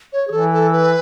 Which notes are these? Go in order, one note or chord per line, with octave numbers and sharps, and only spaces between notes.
C#5
G#4
E3 A4
A4
B4